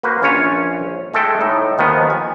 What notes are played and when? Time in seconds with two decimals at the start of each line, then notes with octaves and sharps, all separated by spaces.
0.03 A#3 F#4 B4 C5
0.22 A#1 C#4 F4 C#5 G#5
1.14 G#3 A3 A4 G5
1.41 A2 D#4
1.78 D#2 D#3 F3 B3
2.10 G#5